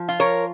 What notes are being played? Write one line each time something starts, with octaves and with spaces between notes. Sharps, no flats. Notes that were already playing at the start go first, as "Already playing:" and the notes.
Already playing: F3
F4
A#4 C#5